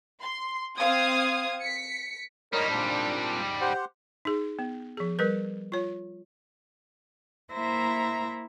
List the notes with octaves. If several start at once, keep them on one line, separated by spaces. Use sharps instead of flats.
C6
C4 F5 D#6 G#6
B6 C#7
G#2 G3 A#4 C#5 D#5
A#2 C4 D4
G4 C5 F#5
D#4 G#4
B3
F3 G#4
G3 A#4 B4
F4 C#5
A#3 E4 C5 E5 A#5 A#6